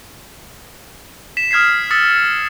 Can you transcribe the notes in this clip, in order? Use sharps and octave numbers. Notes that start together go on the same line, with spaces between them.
B6 E7
D#6 F6 G#6 B6 C7
D#6 E6 A6 B6 C#7